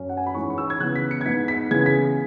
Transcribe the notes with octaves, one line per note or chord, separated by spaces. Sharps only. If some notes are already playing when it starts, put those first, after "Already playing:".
Already playing: F#2 F#3 C#4
F#5
G#5
B5
G#2 E3 C#4 C#6
C#6
E6
G#6
C#3 E3 B3 F#6
B6
C#7
G#6
G#2 G#3 B3 B6
B6
C#3 E3 G#3 B3 G#6
B6